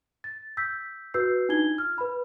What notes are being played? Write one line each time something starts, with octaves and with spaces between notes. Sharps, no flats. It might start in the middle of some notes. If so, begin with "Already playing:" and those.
A6
E6 G6 B6
F#4 B4 E6 G6 C7
D4 D#4 F4 G#6 G7
F6
B4 B5